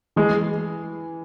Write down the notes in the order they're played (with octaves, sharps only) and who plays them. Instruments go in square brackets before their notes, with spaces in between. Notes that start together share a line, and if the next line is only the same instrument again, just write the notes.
[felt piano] E3 [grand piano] G#3